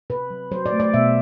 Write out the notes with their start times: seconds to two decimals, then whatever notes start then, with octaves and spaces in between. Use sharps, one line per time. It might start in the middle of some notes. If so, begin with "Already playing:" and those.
0.10 C3 B4
0.30 F#3
0.51 F#3 C5
0.66 D5
0.72 A3
0.80 D5
0.94 B2 E5